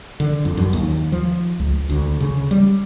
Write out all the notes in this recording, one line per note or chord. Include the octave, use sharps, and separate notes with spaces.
D3
F2
F#2
D#2
F3
C#2
D2
C#3
G3